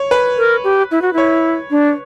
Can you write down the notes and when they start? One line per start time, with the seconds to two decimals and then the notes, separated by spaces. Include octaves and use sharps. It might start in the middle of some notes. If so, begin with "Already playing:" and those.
Already playing: C#5
0.11 B4
0.37 A#4
0.64 G4
0.91 E4
1.02 F#4
1.13 E4 C#5
1.71 D4